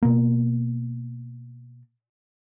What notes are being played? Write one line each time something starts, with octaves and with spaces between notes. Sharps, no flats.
B2 A#3